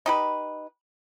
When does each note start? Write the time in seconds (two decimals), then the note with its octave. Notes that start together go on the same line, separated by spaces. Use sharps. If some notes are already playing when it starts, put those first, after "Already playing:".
0.06 D#4 G4 B4